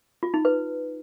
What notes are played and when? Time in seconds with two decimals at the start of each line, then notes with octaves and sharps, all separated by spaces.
0.23 F4
0.34 D#4
0.45 B4